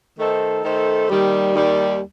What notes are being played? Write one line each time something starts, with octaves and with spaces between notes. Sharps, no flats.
D#3 A3 D#4 A4 C5
D#3 A3 D#4 A4 C5
D#2 D#3 G3
D#2 D#3 G3